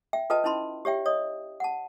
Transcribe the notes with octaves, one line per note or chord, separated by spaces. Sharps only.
E5 G5
F4 A4 B4 D#5 G5 A5
C#4 D#4 E4 A5 B5 C6
G4 C#5 E5 G5
C#5 D#5 D#6
F#5 A5